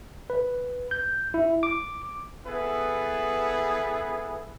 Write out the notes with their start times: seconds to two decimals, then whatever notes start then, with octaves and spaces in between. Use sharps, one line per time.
0.30 B4
0.91 G6
1.34 E4
1.63 D6
2.45 B3 E4 G#4 A4 B4